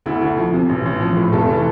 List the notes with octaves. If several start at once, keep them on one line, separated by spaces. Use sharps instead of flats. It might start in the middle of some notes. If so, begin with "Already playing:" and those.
D2 E4
D2
F3
C3
A1
A1
F3
A2
F1 A4
E3